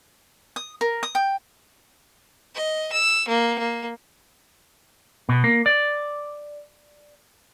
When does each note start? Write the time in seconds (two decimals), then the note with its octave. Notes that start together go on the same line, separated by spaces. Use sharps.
0.56 D#6
0.81 A#4
1.03 D#6
1.15 G5
2.55 D#5
2.93 E6
3.28 A#3
3.59 A#3
5.29 B2
5.44 A#3
5.66 D5